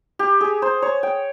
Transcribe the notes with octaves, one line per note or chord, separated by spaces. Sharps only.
G4
G#4
C5
C#5
G5